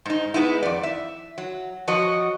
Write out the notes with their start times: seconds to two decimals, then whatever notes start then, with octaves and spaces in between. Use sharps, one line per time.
0.06 G#2 D#4
0.34 G#3 B3 D#4 E4
0.63 F2 D5
0.83 E5
1.38 F#3
1.88 F3 F#3 F#4 D#5